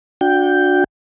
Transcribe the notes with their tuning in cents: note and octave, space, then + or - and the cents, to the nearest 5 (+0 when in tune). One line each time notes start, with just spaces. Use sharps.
D4 +0 F#4 -30 G5 +0